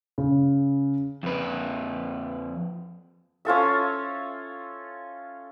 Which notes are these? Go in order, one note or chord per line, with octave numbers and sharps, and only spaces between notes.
C#3
F2 B4
C#4 F4 A4 E5